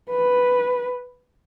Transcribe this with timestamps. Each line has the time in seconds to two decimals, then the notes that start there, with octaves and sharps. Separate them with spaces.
0.10 B4